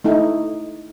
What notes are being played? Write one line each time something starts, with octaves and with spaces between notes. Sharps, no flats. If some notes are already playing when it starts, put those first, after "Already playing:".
A3 D#4 E4